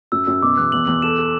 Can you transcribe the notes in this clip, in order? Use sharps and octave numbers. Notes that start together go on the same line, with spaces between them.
F#2 E6
F#2 E6
B2 D6
E2 F#6
E2 F#7
E2 F#7
A4 E7
A4